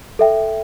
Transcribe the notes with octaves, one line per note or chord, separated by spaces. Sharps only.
A4 E5 G5